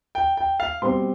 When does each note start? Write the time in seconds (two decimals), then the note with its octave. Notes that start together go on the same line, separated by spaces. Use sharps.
0.15 G5
0.37 G5
0.60 F5
0.82 B2 G3 C4 C6